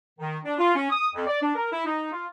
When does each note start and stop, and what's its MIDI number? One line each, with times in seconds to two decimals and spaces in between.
0.19 0.38 51
0.44 0.55 62
0.58 0.74 65
0.75 0.87 61
0.90 1.08 87
1.15 1.26 41
1.26 1.38 74
1.42 1.52 62
1.56 1.70 70
1.72 1.85 64
1.86 2.10 63
2.12 2.25 65